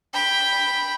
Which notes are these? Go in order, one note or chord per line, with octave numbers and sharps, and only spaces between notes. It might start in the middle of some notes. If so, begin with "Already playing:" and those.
G5 B5